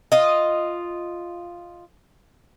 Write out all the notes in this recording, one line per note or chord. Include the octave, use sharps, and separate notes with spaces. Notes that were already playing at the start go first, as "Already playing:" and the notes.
F4 D#5